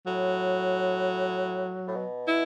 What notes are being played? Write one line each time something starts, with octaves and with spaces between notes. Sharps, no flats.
A2 F#3
A2
B2
E4